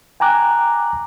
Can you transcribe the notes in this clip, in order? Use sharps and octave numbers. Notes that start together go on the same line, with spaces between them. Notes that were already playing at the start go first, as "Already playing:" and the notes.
G5 G#5 A#5 D6 F#6